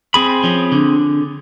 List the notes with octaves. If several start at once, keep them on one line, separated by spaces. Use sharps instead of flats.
C4 G#4 B5
F3 C#4
D3